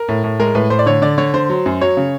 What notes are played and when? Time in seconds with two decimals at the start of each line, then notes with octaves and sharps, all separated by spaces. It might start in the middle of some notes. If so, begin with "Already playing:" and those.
Already playing: A#4
0.09 A2
0.24 A2
0.39 G#3 A#4
0.55 A2 B4
0.70 A2 C5
0.79 D5
0.86 D3 C#5
1.02 D3 D5
1.18 D3 C#5
1.34 D3 C5
1.50 F#3
1.66 F#2
1.81 F#3 C#5
1.97 C#3